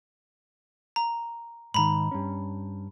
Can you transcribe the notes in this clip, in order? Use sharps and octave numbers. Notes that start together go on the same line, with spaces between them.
A#5
G#2 D#3 A#5 B5
G2 C#4